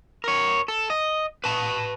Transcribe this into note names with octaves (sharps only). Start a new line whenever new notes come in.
A#4 C#5
A4
D#5
B4 A5